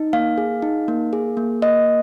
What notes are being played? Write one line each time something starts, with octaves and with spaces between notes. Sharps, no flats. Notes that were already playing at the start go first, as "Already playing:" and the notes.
Already playing: D#4
A#3 F5
G#4
D#4
A#3
G#4
A#3
A#3 D#5